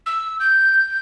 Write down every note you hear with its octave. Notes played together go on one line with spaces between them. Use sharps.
E6
G6